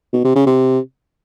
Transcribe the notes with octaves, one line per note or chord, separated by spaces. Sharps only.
B2
C3
C#3
C3